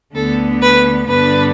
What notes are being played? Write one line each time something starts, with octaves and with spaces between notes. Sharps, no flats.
D2 D3 B3 A4
B4
G2 D3 B3 D4 B4